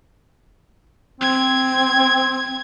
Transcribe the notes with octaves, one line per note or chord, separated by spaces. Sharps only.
C4 G#6